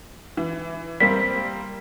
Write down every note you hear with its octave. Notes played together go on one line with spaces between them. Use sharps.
E3
G3 A#3 C4 B6